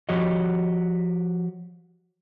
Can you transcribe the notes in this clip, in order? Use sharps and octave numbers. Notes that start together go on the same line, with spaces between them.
F3 F#4 G4 C#5 D#5